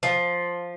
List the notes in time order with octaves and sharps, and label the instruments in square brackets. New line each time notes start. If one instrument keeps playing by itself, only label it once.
[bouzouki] F3